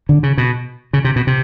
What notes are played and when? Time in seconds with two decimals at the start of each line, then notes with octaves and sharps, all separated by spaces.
0.09 D3
0.23 C#3
0.38 B2
0.93 C#3
1.05 C3
1.16 B2
1.27 C3